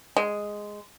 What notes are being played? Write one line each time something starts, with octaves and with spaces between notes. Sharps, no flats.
G#3